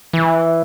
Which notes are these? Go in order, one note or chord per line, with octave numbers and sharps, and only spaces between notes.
E3